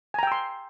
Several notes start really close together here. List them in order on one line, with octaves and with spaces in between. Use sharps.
G#5 A#5 G5 E6 C6